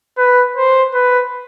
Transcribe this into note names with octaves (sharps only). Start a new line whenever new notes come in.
B4
C5
B4